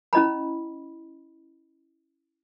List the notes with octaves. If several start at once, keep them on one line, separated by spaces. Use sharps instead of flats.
C#4 E4 D#5 A#5 B5